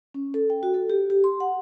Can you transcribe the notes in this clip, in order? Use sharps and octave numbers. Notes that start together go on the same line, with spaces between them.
C#4
A4
G5
F#4
A4
G4
G4
C6
F#5